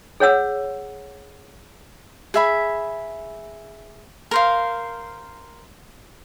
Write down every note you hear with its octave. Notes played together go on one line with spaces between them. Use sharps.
G#4 C#5 F#5 E6
G#4 E5 B5
A#4 C5 F5